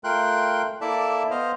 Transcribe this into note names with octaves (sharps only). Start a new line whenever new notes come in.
A3 F4 A#4 G5 C6 F#6
A#3 E4 A4 D5 E5 A5
B3 C5 D#5 F5